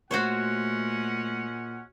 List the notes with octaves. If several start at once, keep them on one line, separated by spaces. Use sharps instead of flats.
A#2 G#3 A3 C#4 F#4 C5 C#5 F#5